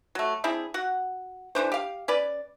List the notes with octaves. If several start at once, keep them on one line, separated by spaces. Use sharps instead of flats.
F#3 A3
C4 D4 E4 G#4
F#4 F#5
D3 E3 D4 C5
G4 F5
C#4 B4 D5